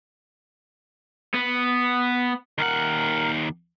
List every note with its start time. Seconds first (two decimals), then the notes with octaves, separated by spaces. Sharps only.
1.34 B3
2.58 D#2 A#4 F#5